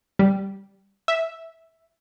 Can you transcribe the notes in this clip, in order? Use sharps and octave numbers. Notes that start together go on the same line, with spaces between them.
G3
E5